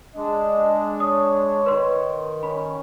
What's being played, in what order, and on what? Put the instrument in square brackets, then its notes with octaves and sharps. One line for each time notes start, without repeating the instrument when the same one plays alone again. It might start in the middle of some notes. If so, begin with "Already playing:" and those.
[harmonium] G#3 D4 [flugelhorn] D#5
[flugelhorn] C#5 [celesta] D#6
[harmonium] D#3 [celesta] B4 C6
[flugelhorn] C#4 [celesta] B5